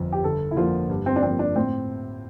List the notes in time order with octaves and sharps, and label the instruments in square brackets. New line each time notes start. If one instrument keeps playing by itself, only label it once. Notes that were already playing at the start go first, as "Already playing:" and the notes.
Already playing: [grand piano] G1 F2
[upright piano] G4
[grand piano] G1 [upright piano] A4
[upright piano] E4
[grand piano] F2 D3 F3 A#3 [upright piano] F4
[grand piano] G2
[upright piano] C4
D4
[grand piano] F3 A#3 [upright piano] C4
[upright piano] D4
[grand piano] A2 [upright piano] C4